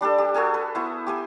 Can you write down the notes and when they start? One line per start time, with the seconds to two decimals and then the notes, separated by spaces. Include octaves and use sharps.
0.01 G3 D4 G4 A4
0.18 G4
0.34 F#4 G#4 A4 G#5
0.54 B4
0.75 B3 E4 C5
1.07 G4 C5 G#5